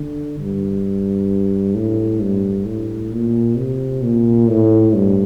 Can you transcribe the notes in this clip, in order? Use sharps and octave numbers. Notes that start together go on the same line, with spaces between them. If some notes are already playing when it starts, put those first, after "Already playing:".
Already playing: D3
G2
A2
G2
A2
A#2
C3
A#2
A2
G2